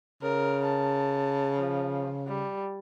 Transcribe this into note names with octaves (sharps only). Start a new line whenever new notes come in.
C#3 A#4
A5
F3
G3